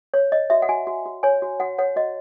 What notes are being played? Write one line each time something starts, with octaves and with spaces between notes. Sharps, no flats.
C#5
C#5 D#5
F#4 E5
F#5
F#4 G#5
F#4
F#4
C#5 G#5
F#4
F#4 F#5
C#5 F#5
F#4 D#5